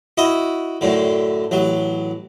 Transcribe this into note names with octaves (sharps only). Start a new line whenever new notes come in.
E4 F#4 D#5
F#2 A2 D3
A1 F#3